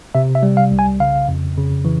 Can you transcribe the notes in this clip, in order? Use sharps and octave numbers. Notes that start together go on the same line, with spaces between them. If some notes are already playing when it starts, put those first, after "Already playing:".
C3 E5
E5
G3
F5
C2
G#5
C#3 F5
F2
C#3
E3